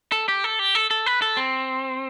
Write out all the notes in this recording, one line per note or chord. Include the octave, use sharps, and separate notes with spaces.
A4
G4
A4
G4
A4
A4
B4
A4
C4